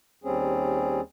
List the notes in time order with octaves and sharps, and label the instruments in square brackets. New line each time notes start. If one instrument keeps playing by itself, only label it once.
[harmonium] D#2 G3 C4 C#4 G#4